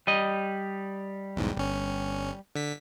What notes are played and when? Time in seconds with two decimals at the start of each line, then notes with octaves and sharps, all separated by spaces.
0.07 G3 D#5
1.36 B1 E2 G#2
1.57 G1 C#4
2.55 D3 B6